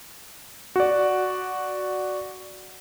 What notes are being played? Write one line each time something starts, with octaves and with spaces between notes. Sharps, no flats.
F#4 D5